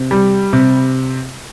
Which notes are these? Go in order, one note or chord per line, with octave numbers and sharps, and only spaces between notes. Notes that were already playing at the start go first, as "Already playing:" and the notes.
Already playing: C3
G3
C3